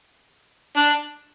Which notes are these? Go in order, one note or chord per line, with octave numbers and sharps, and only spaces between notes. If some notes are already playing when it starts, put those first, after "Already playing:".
D4